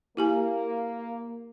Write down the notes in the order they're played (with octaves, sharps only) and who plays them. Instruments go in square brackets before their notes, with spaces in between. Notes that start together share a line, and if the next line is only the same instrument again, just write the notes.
[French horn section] A#3 [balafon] E4 G4 G#5